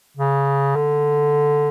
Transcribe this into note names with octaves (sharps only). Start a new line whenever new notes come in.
C#3
D3